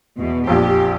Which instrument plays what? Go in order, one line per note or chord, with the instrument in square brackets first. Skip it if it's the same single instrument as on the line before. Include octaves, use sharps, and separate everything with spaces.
[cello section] E2 B2
[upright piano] A#1 F2 [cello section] G4